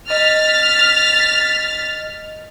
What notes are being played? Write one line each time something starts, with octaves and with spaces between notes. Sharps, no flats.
D#5 F6 A6 B6